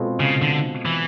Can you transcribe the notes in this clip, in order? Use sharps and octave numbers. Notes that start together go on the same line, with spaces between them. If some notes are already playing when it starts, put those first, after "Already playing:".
Already playing: B2 G#3 C4 F4 A4
C#3
D3
E3